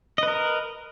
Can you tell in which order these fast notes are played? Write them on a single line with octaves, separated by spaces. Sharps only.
D#5 B4 A#4